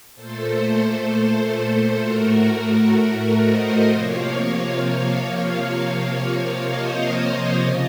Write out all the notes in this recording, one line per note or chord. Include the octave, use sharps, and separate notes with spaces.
A#2 A3 A4 C5
A2 A3 F#4 A#4
C5 D#5
C3 F3 A#3 C#5 F5
C3 F3 A#3
C5 D#5
C#3 F4